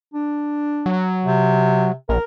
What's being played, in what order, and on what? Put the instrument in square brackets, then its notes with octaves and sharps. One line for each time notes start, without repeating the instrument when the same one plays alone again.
[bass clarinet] D4
[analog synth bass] F#3
[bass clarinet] C3
[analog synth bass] A#1 [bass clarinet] A#4